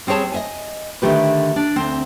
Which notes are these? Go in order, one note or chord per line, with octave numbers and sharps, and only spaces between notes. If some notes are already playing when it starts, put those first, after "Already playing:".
G3 C4 G#4 C#5 A5
D#5 E5 G#5
D3 D#3 A3 G4 B4
D4
D2 C4